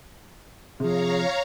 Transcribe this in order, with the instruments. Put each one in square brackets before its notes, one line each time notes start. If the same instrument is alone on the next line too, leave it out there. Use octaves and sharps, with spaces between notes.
[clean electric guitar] C3 F3 [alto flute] G#4 [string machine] C#5 F5 A#5